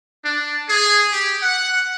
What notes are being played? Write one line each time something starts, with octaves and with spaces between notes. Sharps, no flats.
D4
G#4
G4
F#5